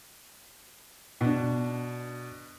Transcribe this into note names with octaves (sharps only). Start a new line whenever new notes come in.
B2 D4